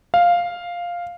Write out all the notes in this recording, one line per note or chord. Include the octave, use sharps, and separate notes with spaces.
F5